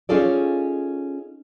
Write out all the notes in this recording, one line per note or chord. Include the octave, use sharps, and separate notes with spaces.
C#4 D#4 F4 G#4 A4 D5